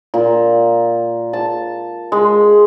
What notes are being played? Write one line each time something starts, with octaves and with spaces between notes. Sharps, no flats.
A#2
A5
G#3